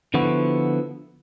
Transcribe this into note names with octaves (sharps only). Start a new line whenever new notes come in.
D3 F3 B3 E4 F#4